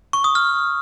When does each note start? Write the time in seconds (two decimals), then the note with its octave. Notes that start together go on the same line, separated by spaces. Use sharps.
0.13 C#6
0.24 D#6
0.35 F6